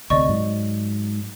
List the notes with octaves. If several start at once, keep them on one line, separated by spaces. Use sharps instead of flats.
D2 C3 D5 D#5 C#6
G#2 F#3